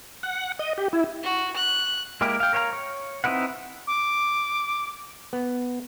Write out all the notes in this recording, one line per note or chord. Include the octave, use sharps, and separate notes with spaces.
F#5
D#5
G4
E4
F#4
F#6
G#3 A#3 E4 G4 A#4
F5 G5
A#4 C#5 F5 G5 A#5
C#5
C4 D#4 E4 B4 F#5
D6
B3